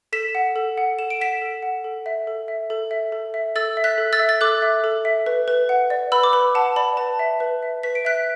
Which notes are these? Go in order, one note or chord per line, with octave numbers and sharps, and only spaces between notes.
A4 B6 E7
F#5
A4
F#5
A4 E7
D7
F#5 B6 E7
A4
F#5
A4
E5
A4
E5
A4
E5
A4
E5
A4 E6 A6
E5
F#6 B6
A4
E6 A6
E5
A6
A4 D6 F#6
E5
A4
E5
B4
B4
F#5
D5
B4 B5 E6
D6
B4 B5
F#5 A5
D5 B5
B4 A5
E5
B4
E5
B4 B6
D7
E5 F#6 B6